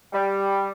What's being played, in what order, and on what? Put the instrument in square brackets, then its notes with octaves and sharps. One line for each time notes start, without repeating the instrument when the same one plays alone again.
[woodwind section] G3